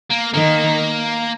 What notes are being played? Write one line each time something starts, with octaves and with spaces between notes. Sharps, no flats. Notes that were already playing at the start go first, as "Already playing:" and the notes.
A#3
D#3 A#3